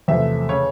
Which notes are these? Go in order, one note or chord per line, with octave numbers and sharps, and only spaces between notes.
E2 C3 F3 A3 E5
C#3 C#5